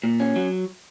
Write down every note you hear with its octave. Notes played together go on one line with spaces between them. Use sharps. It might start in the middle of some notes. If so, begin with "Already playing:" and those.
A#2
C#4
F#3